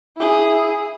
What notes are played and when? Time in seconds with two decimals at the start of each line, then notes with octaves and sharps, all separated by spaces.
0.16 E4 G#4